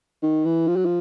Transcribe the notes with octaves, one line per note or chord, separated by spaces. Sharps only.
D#3
E3
F3
F#3
F3